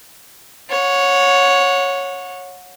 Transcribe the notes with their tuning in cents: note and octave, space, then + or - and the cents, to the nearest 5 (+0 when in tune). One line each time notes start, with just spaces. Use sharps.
C#5 +0 F#5 -30